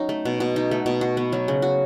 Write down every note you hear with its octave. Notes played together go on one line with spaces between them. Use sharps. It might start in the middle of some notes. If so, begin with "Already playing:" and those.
Already playing: F#3 C#4 D#4
A3
B2
B2
D#4
A3
B2
F#4
B3
F#3
C#3
F#4